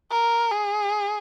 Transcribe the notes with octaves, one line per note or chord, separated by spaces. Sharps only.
A#4
G#4